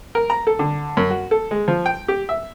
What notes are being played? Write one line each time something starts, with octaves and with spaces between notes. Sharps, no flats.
A#4
A#5
A4
D3
F#2
F#4
A4
G#3
F3
G5
G4
E5